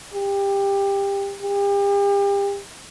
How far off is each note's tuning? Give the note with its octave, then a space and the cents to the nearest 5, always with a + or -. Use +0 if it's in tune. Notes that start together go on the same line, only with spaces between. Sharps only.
G4 +20
G4 +35